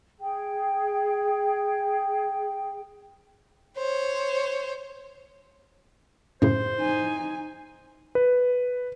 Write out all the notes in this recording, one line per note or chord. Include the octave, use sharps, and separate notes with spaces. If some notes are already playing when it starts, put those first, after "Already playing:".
G#4 G5
C5 C#5
F#2 A2 C#3 C5
D#4 G#5
B4